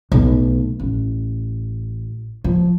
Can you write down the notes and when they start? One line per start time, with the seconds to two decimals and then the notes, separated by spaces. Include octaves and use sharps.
0.12 B1 A3
0.80 A1
2.44 F3